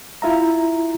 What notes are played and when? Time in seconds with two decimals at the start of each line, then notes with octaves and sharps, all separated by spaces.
0.22 E4 F4 E5 A#5